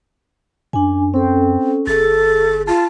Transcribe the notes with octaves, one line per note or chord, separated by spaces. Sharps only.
F#2 D4 G#5
C4 C#4 A4
G1 G#4 A4 A6
F4 A5